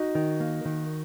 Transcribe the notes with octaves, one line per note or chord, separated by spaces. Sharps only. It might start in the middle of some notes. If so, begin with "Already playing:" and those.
Already playing: D#4 F#4
D#3
A#3
D#3